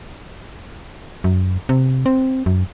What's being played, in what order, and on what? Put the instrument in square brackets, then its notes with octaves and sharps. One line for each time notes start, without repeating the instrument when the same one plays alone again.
[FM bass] F#2
C3
C4
F#2